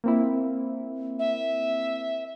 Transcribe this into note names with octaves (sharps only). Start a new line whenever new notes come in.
A#3 C4 E4
E5